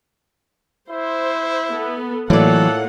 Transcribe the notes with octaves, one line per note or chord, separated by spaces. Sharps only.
E4 C5
B3 A4
A2 E3 F#3 A#3 F4 A4 D5 F#5